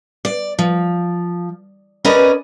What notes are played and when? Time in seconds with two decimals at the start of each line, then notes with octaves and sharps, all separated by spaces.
0.25 D5
0.59 F3
2.05 C#4 G#4 A#4 B4 D5 D#5